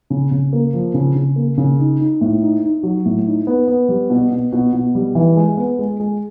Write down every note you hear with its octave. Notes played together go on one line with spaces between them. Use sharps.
C#3
C#3
A#3
F3
C#3
C#3
A#3
C#3
D#4
D#4
A2
D#4
D#4
F#3
A2
D#4
B3
B3
G3
B2
B2
B2
B2
G3
E3
G#3
B3
G#3
G#3